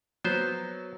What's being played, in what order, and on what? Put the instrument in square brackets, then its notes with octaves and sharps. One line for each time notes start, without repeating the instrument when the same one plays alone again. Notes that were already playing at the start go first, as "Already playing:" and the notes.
[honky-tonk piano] F#3 [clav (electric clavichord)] B3 C5